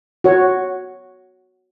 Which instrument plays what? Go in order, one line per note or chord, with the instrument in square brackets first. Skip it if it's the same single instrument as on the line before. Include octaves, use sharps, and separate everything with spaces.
[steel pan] F#4 C#5